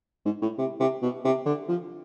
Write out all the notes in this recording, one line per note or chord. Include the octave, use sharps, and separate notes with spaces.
G#2
A2
C3
C3
B2
C3
D3
F3